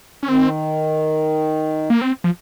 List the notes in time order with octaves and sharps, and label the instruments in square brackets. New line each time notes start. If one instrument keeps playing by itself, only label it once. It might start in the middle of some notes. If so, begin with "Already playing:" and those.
[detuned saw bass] C#4
[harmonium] D#3 [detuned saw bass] C4
[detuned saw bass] A#3
C4
F3